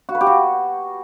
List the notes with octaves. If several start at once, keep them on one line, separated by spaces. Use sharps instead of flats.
F#4
B4
G4
F#4